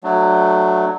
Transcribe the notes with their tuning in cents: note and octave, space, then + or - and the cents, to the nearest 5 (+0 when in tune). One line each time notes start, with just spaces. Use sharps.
F#3 +0 A3 +0 D4 +20